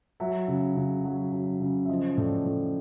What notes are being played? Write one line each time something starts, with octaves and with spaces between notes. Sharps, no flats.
F#3 E5
C#3
C#3
F#3
F#3
C#3
E5
F3 D#5
A2 D5
A2